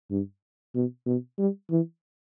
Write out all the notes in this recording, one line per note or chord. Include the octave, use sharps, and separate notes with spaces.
G2
B2
B2
G3
E3